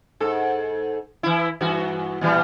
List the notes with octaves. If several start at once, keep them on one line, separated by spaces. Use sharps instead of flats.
G#2 A4
E3 E4
G2 E3 F#4
A#2 E3 G3